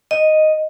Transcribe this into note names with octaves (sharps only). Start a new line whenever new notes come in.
D#5